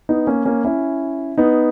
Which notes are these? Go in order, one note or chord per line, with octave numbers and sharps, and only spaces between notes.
B3 D#4
A#3 C#4
A#3 C#4
C#4 E4
B3 D#4